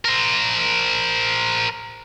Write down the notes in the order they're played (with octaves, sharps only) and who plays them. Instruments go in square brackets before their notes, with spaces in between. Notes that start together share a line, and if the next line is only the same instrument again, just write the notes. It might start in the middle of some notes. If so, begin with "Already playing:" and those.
[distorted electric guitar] A#4 C5